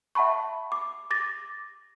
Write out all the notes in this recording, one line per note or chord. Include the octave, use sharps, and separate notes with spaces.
E5 F#5 A5 B5 C#6
D6
D6 A6 A#6